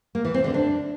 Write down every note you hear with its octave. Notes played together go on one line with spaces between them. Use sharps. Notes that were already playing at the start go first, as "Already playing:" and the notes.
A#3
E3
C4
D3
D4